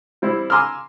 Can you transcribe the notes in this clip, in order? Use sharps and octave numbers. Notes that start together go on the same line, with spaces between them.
G3 C4 E4
G#5 A#5 C6 D6 E6 F6